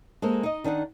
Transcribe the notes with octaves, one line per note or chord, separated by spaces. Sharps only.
G#3 A#3 A4 C5
D#4 D#5
D#3 D4 D#4 F#5